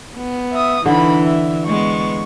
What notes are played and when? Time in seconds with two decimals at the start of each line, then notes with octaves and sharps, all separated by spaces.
0.16 B3
0.53 E5 D#6
0.86 D3 E3 D#4 B5
1.23 E5
1.67 G#3 B3 C#6